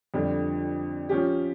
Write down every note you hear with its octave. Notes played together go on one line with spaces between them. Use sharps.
F2 D3 G3 D4
F3 C#4 G4